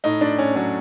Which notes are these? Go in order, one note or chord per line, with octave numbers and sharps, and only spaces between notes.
A2 D#4
A2 D4
A2 C#4
F#3 C#4